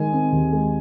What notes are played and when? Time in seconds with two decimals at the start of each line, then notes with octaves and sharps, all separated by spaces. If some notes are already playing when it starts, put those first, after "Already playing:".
Already playing: D#3 G#3 G#5
0.13 C4
0.32 D#2
0.52 G#3